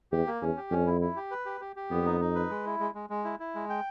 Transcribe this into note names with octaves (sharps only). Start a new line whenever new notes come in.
E2 G4
A#3
E2 C#4
G4
F2 C#4
E4
E4
G4
B4
G4
G4
G4
F2 B3
D#4
D#4
B4
G#3
E4
G#3
G#3
G#3
E4
E4
G#3
G5